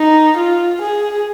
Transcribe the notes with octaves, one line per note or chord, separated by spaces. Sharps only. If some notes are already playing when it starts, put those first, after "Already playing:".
Already playing: D#4
F4
G#4